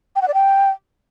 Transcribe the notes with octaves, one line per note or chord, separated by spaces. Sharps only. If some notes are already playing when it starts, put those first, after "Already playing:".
G5
F#5
D5
G5